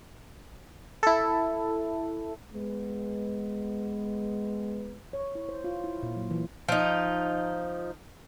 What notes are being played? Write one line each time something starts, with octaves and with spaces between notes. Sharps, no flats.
E4 A4
G#3 B3
C#5
E4
C5
F4
E4
A#2
F#3
E3
F3 D#4